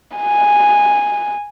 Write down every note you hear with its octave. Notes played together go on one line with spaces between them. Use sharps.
G#5